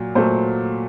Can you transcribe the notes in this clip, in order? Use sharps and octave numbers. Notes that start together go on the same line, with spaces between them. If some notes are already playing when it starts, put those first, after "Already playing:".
Already playing: A#2 F#3
A#2 F#3 A3 C5